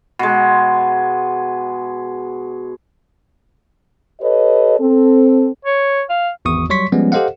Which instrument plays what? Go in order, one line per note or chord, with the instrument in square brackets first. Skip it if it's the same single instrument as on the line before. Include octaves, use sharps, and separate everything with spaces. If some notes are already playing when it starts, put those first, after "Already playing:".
[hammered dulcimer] B2 G#3
[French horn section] G4 A4 B4 C#5 D#5
C4 A4
[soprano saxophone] C#5
F5
[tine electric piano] G#1 E2 C#6 D#6
F#3 G3 C#5 C6 C#6 B6
F3 G3 G#3 B3 C#4
G4 A4 C5 D#5 F5 F#5